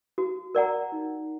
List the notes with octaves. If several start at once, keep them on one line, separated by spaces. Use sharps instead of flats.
F#4
A#4 D5 F#5 A#5
D#4